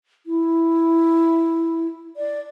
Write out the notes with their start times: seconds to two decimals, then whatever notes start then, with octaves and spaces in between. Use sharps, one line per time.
0.26 E4
2.16 D5